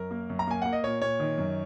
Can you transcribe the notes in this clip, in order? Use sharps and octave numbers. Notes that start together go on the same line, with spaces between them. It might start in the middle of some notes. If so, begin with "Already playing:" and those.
Already playing: F#2 A#4
A#3
F#2
A#5
A#3 G#5
A#3 F#5
D#5
A#2 C#5
A#2 C#5
D#3
F#2